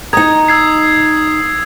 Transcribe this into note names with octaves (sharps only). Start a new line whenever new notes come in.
D#4 A#5 D#6 G#6
E6 G#6 C7